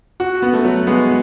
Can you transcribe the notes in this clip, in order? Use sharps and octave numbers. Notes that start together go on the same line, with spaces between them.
F#4
B3
A3
F#3
G#3 B3